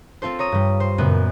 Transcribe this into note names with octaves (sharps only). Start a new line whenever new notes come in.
C4 F4 A4 C5
C#5 A#5 D#6
G2 G3
C5
F#2 A#2 C#3 B3